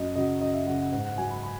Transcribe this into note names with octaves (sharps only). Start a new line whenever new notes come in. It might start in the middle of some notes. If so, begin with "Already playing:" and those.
Already playing: F#2 D#5
C#3 F#3 D#5
F#2 D#5
E5
C#3 F#3 F#5
F#5
G#2 F#5
F#5
F#3 G#5
B5
B5